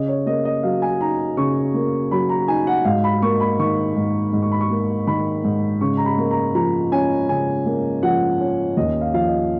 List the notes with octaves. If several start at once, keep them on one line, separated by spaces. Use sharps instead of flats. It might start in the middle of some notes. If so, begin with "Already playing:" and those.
Already playing: C#3 D#5
C#5
A#3 D#5
D#5
F#3 F5
G#5
D#4 A#5
C#3 C#6
A#3
F#3 B5
A#5
D#4 G#5
F#5
G#2 F5
B5
A#3 C#6
B5
D#3 C#6
G#2
G#2
C#6
B5
C#6
A#3
D#3 B5
G#2
C#3 C#6
A#5
B5
A#3
A#5
F3 A#5
C#4 G#5
C#3 G#5
A#3
F3 F#5
C#4
D#2 D#5
F5
F3 F5
D#5